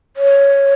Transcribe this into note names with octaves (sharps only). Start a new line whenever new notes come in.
C#5